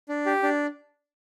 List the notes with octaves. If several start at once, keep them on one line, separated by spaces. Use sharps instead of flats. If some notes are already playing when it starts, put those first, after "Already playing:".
D4
G4
D4